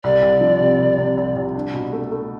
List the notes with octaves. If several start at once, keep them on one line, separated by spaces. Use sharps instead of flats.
C2 D5
C2
F3
C3
C2
C3
C2
C2
D4
B2
A3
A3